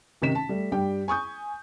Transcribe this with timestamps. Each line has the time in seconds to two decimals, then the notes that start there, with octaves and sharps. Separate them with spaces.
0.22 A1 C3 D#3 D#4 B6 E7
0.35 A5
0.49 G3 A3
0.72 G2 G3 G4 G5
1.08 G#5 C#6 D#6 G6